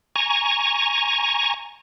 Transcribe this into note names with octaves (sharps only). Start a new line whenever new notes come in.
G#5 A#5 C#6